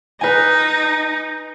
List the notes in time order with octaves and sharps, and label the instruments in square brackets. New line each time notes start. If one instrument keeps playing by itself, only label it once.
[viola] D#4 [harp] B4 G#5